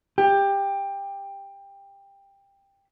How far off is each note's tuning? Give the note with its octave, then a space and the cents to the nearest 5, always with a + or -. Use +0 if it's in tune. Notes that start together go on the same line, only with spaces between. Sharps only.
G4 +15